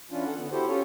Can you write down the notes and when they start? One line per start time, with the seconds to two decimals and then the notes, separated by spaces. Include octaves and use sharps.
0.11 E3 C#4 D4 F4
0.26 A4 F#5
0.38 D3 B3
0.51 E4 F#4 G4 A4 C5
0.67 C#4 F4 G4 A4 C#5